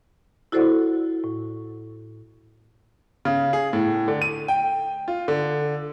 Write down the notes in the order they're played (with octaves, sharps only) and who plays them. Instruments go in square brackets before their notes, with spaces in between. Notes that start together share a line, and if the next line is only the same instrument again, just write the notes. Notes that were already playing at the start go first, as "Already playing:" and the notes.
[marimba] E4 F#4 A4 C5 D5 F#5
A2
[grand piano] C#3
G#4
A2
D3
D#7
G5
F4
D3